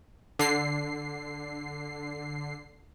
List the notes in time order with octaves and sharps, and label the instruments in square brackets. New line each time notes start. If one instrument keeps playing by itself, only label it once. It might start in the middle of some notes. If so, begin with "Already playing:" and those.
[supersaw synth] D3 C7